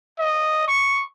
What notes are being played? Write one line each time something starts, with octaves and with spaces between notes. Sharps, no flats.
D#5
C#6